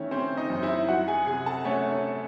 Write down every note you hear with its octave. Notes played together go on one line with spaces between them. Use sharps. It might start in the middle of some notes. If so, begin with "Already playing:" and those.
Already playing: D#3 A3 C#4 E4 C#5
C4 C#4 C5
D#4 D#5
F#2
E4 E5
F#3 F#4 F#5
G#4 G#5
C3 G#4 G#5
A4 A5
A3 C#4 C#5
C#4 C#5